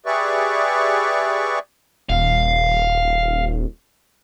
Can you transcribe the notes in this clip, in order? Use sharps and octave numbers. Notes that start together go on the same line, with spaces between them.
G4 G#4 B4 D5 E5 C#6
D#1 F5